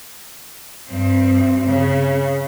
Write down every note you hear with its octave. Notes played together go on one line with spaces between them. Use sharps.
G2 C4
C#3